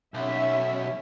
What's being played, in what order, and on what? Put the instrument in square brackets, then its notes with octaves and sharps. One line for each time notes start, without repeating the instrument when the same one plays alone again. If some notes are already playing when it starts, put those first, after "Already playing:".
[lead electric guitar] B1 [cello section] C#4 E5